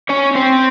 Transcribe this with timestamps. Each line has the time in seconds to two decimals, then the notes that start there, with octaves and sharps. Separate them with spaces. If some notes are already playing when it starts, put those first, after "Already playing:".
0.09 C#4 C#5
0.35 C4 C5